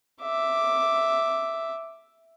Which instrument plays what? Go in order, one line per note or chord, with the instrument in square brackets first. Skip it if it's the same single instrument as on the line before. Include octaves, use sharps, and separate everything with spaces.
[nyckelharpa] E5 D6